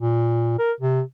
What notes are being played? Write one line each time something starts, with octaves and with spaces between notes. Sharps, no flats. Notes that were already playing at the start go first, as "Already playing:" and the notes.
A#2
A#4
C3